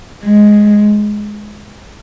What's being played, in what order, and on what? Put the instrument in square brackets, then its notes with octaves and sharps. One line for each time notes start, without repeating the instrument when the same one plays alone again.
[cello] G#3